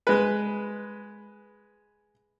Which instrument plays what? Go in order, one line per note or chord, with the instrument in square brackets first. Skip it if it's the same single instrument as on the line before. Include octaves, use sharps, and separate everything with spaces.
[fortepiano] G#3 B4